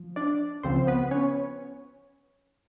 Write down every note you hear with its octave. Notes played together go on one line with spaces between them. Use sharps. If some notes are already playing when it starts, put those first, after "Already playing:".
Already playing: F3
D4 D5
C#2 C#3 F3 C4 C5
B3 B4
C#4 C#5